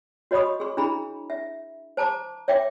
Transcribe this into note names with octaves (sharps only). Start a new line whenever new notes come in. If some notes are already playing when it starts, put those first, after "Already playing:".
F#4 C#5 D#5 B5 C#6 D#6
G#4 C6
D4 E4 G#4 A#5 B5
E5
C5 A5 A#5 D6
C#5 E5 G5 D6